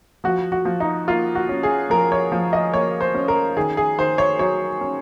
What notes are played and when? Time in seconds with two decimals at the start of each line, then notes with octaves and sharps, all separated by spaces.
0.24 F3 F#4
0.52 F#4
0.65 F3
0.80 D#4
1.08 A#3 F4
1.35 F#4
1.49 C#4
1.63 G#4
1.90 F3 A#4
2.12 C#5
2.32 F3
2.53 D#5
2.73 A#3 C#5
3.01 C5
3.15 C#4
3.28 A#4
3.57 D#3 G#4
3.77 G#4
3.98 D#3 C5
4.18 C#5
4.39 F#3 C#5
4.81 C#4